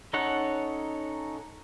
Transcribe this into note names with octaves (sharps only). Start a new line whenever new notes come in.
C#4 D#4 A4 C#5 F#5